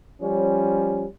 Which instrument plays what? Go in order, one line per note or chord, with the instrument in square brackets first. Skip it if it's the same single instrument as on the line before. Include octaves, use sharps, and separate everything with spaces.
[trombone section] F3 G3 C#4